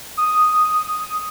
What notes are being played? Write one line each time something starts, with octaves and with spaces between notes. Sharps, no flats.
D#6